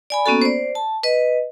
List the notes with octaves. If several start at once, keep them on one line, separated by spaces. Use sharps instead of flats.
D5 G#5 B5
A#3 B3 C#4 F#4 A4
C5 D5
A5
B4 D#5